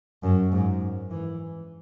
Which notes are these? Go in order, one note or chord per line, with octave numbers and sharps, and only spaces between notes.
F#2
G#2
E3